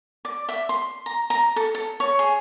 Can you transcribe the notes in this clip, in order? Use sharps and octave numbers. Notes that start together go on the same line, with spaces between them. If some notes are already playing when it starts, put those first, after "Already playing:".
D5
E5
C6
A#5
A#5
A4
A4
C#5
G#4